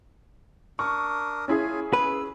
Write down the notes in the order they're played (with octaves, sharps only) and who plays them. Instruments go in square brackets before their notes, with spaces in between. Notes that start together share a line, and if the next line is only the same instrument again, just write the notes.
[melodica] D4 A#4 D#6 [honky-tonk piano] C#6
[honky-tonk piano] C#4 E4 G#4 [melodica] F4 G#5
[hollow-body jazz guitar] B4 [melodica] E6